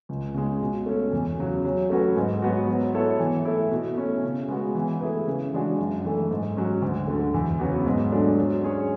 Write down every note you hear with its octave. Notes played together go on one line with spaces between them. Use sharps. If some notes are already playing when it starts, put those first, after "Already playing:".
C#2
C#3 G#3
B2
A3 C#4
E2
C#3 F#3 C#4
F#3
A3 C#4 F#4 B4
G#2
F#3 B3 F#4
F#3
B3 E4 A4 C#5
E3
A3 E4
B2
A3 C#4 E4
C#3
G#3 B3 F#4
E3
A3 E4 G#4 B4
C#3
E3 G#3 D4 F#4
F#2
E3 A3
G#2
F#3 C#4
D2
D3 A3
E2
C#3 F#3 B3 F#4
G#2
F#3 A3 D4
F#3
C#4 G#4 C#5